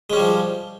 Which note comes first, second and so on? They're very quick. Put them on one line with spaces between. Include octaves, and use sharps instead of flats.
G#3 C#4 G3 F3